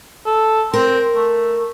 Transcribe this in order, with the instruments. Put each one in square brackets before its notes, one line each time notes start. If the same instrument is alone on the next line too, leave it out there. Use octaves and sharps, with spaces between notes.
[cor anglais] A4
[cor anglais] C4 [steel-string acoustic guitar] A#4
[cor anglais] A3